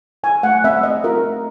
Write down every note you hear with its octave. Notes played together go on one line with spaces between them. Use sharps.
E4 G#5
A3 F#5
C4 E5
A3 D#5
F4 A#4
A3